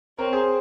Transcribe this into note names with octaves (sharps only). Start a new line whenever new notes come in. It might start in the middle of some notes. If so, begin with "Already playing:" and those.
C4 A#4 C#5
G#4 C5